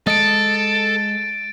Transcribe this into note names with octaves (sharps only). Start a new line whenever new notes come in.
G#3 A4 D#5 A6 D7